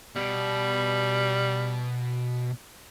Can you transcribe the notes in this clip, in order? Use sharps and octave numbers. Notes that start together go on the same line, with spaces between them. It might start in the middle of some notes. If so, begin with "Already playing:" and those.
B2 G3